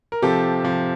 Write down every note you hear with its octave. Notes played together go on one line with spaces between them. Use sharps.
A#4
C3 F3 G4 A4
C3 F3